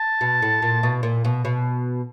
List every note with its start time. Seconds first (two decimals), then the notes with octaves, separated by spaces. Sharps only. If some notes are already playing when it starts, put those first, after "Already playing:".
Already playing: A5
0.21 B2
0.42 A2
0.62 A#2
0.83 B2
1.03 A#2
1.25 B2
1.45 B2